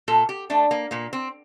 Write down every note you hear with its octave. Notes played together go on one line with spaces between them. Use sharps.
A#2 A4
G4
A3 D4
A#3
A#2 A#3
C4